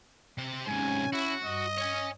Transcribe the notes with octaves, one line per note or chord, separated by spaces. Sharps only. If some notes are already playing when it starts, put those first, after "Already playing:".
C3 C5
G#2 C3 C#4 G#5
E4 F#4
G2 D#5
C#5 G#5